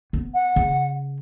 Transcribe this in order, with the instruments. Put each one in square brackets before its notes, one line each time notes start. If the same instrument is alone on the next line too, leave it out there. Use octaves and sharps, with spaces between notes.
[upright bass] B3
[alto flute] F#5
[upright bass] C#3